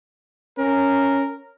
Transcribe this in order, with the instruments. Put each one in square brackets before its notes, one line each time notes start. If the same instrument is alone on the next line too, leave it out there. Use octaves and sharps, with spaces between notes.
[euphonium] C#4 [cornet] A#4